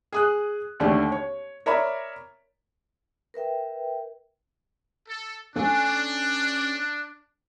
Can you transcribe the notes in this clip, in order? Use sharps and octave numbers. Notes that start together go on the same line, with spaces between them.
G#4 D#6 F#6
D#2 D3 A3 D5
C#5
A#4 C#5 D5 E5 A#5 B5
A#4 B4 E5 G5
A4
C#4 D4 A4 G#5